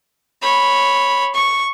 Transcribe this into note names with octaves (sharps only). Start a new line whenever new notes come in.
C#5 B5
C#6